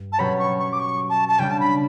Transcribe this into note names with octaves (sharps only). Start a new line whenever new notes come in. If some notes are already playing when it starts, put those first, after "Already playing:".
Already playing: G2
A5
B2 F#3 C#4 G4 C#5 B5
C#6
C#6
D6
C#6
A5
A5
C#3 G3 D4 G5
A5
B5